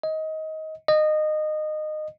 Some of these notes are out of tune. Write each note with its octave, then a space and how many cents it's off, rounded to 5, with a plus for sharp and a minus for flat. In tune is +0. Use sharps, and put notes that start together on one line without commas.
D#5 +20
D#5 -20